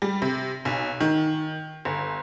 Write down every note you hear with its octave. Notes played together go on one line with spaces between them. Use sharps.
G3
C3
B1
D#3
G1